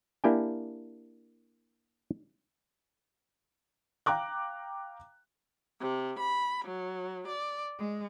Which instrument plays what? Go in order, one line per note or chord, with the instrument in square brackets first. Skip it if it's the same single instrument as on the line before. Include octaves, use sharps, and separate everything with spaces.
[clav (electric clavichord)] A#3 D4 E4 G4 G5 G#5
[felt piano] F5 G5 A#5 D6 F#6
[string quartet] C3
B5
F#3
D5
G#3